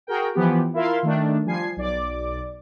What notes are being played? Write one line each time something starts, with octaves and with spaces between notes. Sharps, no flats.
F#4 G#4 A#4 G5
E3 F3 B3 G4
E4 F4 A#4 E5 F5 C6
D#3 A3 D4
F3 G3 G#5 G#6 C7
B1 D5 D6